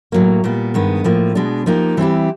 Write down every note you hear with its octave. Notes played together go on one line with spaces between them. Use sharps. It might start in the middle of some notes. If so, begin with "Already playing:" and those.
A2 F#3 A#3
A#2 G3 B3
G2 D#3 G#3 B3
A2 F3 A#3
B2 G#3 B3 D4
F3 A#3 D#4 G4
E3 G3 C4 E4 G4